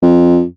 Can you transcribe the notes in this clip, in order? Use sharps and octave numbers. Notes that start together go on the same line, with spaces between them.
F2